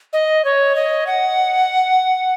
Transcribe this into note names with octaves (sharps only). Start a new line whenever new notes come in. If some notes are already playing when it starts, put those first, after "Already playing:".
D#5
C#5
D#5
F#5